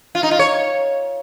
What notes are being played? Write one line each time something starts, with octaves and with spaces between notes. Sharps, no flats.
F4
D#4
F4
C#5